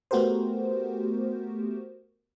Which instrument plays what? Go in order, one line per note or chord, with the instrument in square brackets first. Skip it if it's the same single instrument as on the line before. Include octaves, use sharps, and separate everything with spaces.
[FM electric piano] A3 B3 F#4 G4 A#4 C5